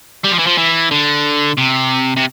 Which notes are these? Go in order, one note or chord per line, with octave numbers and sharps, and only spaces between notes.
G3
F3
E3
F3
E3
D3
C3
C3